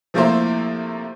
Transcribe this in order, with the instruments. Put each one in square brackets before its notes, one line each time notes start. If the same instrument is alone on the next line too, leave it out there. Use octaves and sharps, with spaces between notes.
[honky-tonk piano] C3 F3 A3 A#3 E4 C5